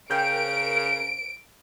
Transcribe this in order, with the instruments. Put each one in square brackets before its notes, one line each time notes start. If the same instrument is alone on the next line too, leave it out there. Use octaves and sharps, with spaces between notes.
[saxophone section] C#3 A#4 [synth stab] G5 [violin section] D7